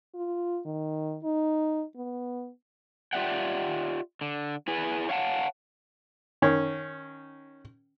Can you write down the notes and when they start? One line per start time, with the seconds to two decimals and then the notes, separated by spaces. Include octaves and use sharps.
0.14 F4
0.66 D#3
1.23 D#4
1.96 B3
3.13 F4 G4 D5 E5 F#5 G5
4.21 D3
4.68 E4 G#4 B4
5.09 C#5 F5 F#5 A5
6.42 D#3 C#4